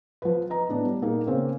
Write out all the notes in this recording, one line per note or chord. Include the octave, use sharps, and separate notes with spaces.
F3 B4
B4 D#5 A#5
A2 B3 D4
G3
A#2 A#3 D#4 G#4
C#3 A#3 C4 C#4